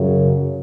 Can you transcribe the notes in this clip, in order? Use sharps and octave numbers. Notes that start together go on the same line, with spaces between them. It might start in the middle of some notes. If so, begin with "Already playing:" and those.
Already playing: F#2 C#3